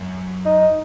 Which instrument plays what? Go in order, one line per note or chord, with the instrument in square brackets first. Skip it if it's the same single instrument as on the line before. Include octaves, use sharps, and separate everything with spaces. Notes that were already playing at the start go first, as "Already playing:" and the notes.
Already playing: [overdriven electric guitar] F#2
[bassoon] D#4